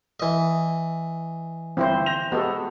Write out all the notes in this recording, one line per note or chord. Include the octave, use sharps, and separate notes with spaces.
E3 D#5
G1 C4 E4 C5
G6 A#6 F7
G#3 B3 F#4 G4 A4